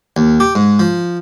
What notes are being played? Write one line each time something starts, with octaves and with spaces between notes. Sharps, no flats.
D#2
G4
G#2
F3